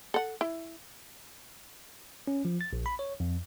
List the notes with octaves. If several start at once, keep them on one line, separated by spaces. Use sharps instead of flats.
A4 F#5
E4
C#4
F3
A6
A#1
B5
C#5
F2